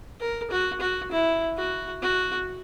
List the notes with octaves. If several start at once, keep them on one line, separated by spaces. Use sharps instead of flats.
A#4
F#4
F#4
E4
F#4
F#4